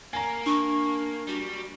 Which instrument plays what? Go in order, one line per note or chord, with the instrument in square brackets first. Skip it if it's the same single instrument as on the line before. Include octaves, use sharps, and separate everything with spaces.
[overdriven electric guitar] A#3 [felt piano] G#5 A#5
[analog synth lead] D4 [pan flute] C#6
[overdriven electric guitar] G3 [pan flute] F#4